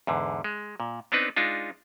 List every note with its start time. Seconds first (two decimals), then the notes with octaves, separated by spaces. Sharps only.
0.07 E2 G#2 D3
0.44 G#3
0.80 A#2
1.12 B3 C4 D4 D#4 B4
1.36 G#3 D4 D#4 F4